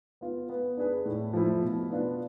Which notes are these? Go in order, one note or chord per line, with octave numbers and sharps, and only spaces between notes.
B3 F4
B3
D4 G#4 B4
A2
F3 A3 E4
B2
B3 D4 F4